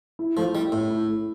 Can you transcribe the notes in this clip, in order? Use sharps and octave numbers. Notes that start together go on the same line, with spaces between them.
E4
F3 A3
G3 E4
A2 A4
E4
A3